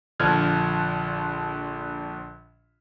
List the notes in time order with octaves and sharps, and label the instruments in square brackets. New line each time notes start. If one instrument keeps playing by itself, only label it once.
[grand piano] A#1 D3 F3 F6 G#6